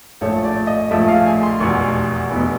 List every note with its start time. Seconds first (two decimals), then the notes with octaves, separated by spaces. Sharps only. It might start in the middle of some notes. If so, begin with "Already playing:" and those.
0.21 A#1 A2 F3 A3 C#5
0.44 D5
0.67 D#5
0.90 A#1 A2 F3 A3 E5
1.08 F5
1.26 G#5
1.43 C6
1.60 F1 E2 B2 C#6
2.31 F1 E2 B2